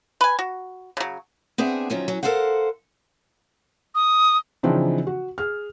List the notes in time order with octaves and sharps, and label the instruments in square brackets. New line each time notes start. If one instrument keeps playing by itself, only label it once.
[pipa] B4 G#5
F#4
C#3 F#3
[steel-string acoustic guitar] B3 C4 D4 G#4 E5 F#5
D#3 F3 F#3 A3 C#4
F#3 C#4 F#4
A4 A#4 C5 F5 F#5
[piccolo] D#6
[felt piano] C#3 E3 F3 C4 D4 D#4
F#4
G#4 F6